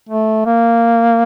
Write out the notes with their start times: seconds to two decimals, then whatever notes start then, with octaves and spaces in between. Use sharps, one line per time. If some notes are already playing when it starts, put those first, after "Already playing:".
0.09 A3
0.46 A#3